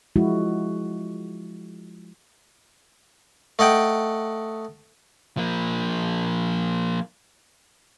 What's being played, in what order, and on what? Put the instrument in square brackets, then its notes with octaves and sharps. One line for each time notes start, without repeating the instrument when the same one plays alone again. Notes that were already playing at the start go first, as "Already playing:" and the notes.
[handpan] F3 G#3 E4 F#4
[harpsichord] A3 D#5 F#5 G5
[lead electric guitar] F3 A#3